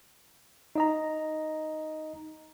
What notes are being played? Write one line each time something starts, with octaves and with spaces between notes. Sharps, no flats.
D#4 D#5 A#5